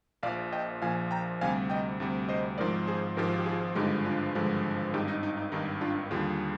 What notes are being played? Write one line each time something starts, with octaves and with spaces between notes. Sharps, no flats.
A#1 A#2 F3 D5 F5
D#5 G5
A#1 A#2 F3 F5 G#5
G5 A#5
D2 C3 G3 F5 G#5
D#5 G5
D2 C3 G3
C5 D#5
G#1 G#2 F3 A#4 D5
G#4 C5
G#1 G#2 F3 G4 A#4
F4
G4
F4 G#4
G#1 G2 D3 F3 G#3 D#4 G4
D4 F4
G#1 G2 D3 F3 G#3
G#1 G2 D#3 D#4 G4
D#4
D#4
D#4
G#1 G2 D#3 D#4
D4 F4
D#2 D3 G3 F4 G#4